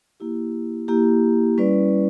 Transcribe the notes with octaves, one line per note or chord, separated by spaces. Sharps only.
A#3 E4 G4
A#3 E4 G4
G3 C#4 E4 B4 D5